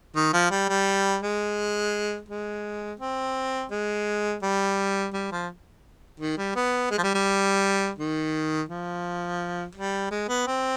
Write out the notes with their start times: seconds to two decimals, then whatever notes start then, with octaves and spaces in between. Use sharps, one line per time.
0.15 D#3
0.33 F3
0.50 G3
0.69 G3
1.22 G#3
2.28 G#3
3.00 C4
3.71 G#3
4.42 G3
5.14 G3
5.31 F3
6.20 D#3
6.37 G3
6.55 B3
6.91 G#3
6.98 F3
7.03 G3
7.14 G3
7.98 D#3
8.69 F3
9.75 G3
10.11 G#3
10.28 B3
10.47 C4